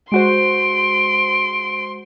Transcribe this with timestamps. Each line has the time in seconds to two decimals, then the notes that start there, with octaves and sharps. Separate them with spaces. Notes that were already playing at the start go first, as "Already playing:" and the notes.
0.12 G#3 F#4 C5 C6 D7